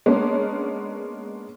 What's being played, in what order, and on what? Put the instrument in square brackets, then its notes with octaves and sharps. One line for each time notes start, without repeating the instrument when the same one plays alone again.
[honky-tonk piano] G#3 A#3 B3 C#4 D4